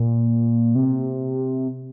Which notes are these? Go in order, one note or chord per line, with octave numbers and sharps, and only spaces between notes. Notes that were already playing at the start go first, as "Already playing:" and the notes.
Already playing: A#2
C3